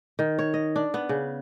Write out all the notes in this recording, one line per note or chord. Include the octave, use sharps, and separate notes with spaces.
D#3
C#5
D#5
D4
B3
C#3